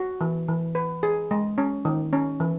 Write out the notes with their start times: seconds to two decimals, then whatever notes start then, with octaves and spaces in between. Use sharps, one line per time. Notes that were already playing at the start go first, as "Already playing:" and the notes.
Already playing: F#4
0.21 E3
0.48 E3
0.75 B4
1.03 G#4
1.31 G#3
1.58 C#4
1.85 D#3
2.13 C#4
2.40 E3